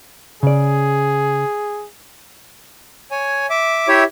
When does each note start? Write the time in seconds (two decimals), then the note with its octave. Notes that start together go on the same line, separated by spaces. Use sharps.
0.43 C#3 G#4 D5
3.11 C#5 G#5
3.50 E5 D6
3.88 E4 G4 C#5 E5